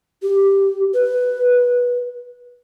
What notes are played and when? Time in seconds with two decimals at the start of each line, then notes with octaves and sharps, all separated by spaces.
0.23 G4
0.94 B4